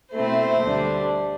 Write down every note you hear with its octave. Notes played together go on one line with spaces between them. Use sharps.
B2 A3 C4 E4 C5
D2 D3 G3 D4